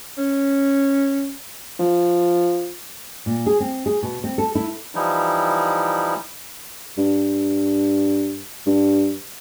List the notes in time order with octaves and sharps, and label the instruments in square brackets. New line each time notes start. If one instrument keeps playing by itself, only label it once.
[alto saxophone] C#4
[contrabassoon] F3
[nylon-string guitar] A#2
G#4
C4
G#4
B2
C4
A4
E4
[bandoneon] E3 F3 G3 D#4 E4
[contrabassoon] G2
G2